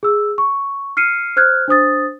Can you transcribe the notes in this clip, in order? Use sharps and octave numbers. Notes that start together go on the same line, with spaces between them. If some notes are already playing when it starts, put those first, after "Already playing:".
G#4 E6
C#6
F6 C7 C#7 D#7
C5 F6 F#6 G#6
D4 C5 D#6 A6